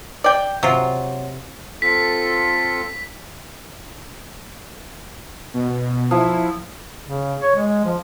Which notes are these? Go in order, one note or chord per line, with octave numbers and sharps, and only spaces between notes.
D5 G5
C3 F#3 F4
C4 F4 A4 B6
B2
F3 E4
C#3
C#5
G#3
F3